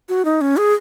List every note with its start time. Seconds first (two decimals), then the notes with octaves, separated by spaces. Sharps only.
0.09 F#4
0.25 D#4
0.41 C#4
0.57 G#4